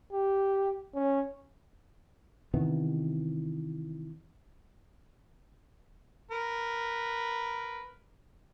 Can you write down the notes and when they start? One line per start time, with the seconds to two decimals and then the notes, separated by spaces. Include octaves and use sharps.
0.12 G4
0.95 C#4
2.54 C3 D#3 E3 B3
6.31 A#4 B4